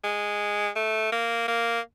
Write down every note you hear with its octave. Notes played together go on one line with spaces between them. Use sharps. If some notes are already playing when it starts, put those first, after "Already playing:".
G#3
A3
A#3
A#3